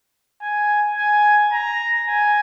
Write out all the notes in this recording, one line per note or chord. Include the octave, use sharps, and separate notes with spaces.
G#5
G#5
A#5
G#5